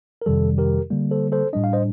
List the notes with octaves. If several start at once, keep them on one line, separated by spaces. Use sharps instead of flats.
A#4
F2 C3 D#3 G3 A4
G4 A#4
D3 G3 A#3
A4 C5
A4 C5
A2 G3 D4 D#5
F5
C5 D#5